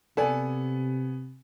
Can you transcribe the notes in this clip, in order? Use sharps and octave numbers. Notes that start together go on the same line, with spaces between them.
C3 B3 A4 D5 G#5